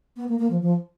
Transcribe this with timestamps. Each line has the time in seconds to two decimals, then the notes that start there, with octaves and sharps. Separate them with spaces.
0.16 B3
0.28 A#3
0.39 A#3
0.50 F3
0.61 F3